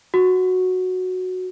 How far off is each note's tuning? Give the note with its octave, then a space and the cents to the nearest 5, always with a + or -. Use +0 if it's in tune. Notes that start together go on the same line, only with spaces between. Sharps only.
F#4 -5